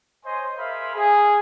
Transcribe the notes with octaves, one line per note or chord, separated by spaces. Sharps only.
C5 C#5 D#5 G#5 C6
G#4 A#4 C5 E5 F5 B5
G#4